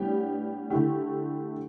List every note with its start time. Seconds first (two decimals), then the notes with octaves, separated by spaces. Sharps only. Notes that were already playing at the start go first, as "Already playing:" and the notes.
Already playing: A2 G3 B3 D4 G4
0.70 D3 A3 E4 G4